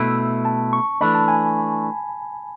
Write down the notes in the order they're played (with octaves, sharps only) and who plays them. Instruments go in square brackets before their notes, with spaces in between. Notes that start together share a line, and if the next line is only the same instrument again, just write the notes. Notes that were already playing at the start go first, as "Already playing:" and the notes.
Already playing: [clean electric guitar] B2 A3 E4
[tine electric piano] A5
C#6
[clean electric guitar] E3 A3 D4 [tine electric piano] B5
[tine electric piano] A5
G#5